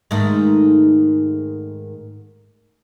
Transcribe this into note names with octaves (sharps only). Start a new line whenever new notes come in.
G#2 D#3 A3